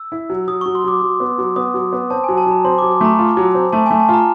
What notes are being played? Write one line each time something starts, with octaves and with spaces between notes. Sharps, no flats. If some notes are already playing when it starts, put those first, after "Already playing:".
Already playing: E6
E4
F#3
F#3 D#6
F#3 C#6
C6
F#3 D6
F#3
B3
F#3
B3 D#6
F#3
B3
C4 A5
F#3 G#5
A5
F#3 A#5
C4 C6
F#3 D6
D6
A3 A#5
F4
F#3
C4
A3 A5
A3 G#5
A5
F4 A#5